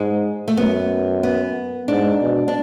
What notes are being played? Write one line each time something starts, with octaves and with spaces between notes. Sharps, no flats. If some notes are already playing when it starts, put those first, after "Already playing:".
Already playing: G#2 G#3
A3
F#2 B3
B3
G#2 D4
B2
D4